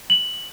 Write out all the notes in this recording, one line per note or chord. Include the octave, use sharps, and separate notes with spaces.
F#7